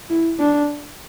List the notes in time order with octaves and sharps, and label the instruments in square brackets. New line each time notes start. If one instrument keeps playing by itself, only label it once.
[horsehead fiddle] E4
D4